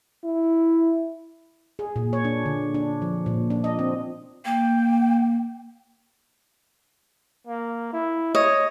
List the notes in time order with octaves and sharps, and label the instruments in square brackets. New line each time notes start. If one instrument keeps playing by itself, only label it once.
[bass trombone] E4
[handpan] G#4
A#2
C#5
D4
D3
D4
F3
A#2
D4
D#5
C4
[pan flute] A#3 [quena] G5
[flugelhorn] A#3
E4
[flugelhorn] C#5 [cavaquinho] D#5